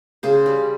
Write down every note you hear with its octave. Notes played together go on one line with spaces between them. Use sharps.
C#3 G#4 C5
G3